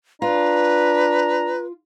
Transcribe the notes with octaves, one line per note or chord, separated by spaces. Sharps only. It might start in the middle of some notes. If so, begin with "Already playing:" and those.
D4 F4 B4 A#5